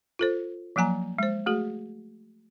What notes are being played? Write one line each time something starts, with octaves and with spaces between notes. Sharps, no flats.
F4 A4 C5
F3 F#3 A#3 G#5 A#5
G#3 C5
A3 F#4 G#4